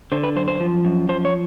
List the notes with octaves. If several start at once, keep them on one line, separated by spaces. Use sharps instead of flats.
D3 C5
B4
F#2 C5
C5
F3
F#2
F3 C5
C#5